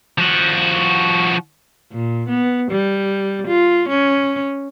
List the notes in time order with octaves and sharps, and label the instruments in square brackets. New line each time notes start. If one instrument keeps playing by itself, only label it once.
[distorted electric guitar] F3 F#4
[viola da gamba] A#2
B3
G3
F4
C#4